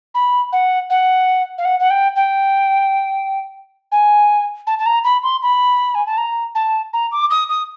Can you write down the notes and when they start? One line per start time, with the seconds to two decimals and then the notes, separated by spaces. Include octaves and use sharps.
0.15 B5
0.52 F#5
0.90 F#5
1.58 F5
1.65 F#5
1.80 F#5
1.90 G5
2.16 G5
3.92 G#5
4.67 A5
4.79 A5
4.86 A#5
5.04 B5
5.23 C6
5.42 B5
5.95 G#5
6.06 A5
6.18 A#5
6.55 A5
6.93 A#5
7.12 D6
7.31 D#6
7.49 D#6